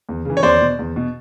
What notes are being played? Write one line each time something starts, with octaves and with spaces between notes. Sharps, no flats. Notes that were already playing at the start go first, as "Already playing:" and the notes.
E2
C#3 E3
C#5
E2 C5 D5
B2
E2
B2